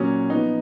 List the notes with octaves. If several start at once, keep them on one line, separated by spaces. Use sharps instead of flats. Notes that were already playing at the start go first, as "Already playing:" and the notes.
Already playing: A#2 F#3 A#3 C#4 D#6
F3 B3 D#4